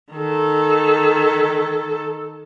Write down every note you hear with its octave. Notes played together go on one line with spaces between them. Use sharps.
D#3 A4